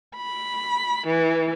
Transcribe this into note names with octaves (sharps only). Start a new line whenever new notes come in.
B5
E3